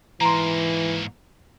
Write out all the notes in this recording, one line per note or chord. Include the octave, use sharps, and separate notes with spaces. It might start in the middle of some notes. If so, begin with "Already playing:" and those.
G#2 E3 A#3 A#5 C6